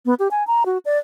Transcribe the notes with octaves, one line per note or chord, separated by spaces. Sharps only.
B3
G4
G#5
A#5
F#4
D5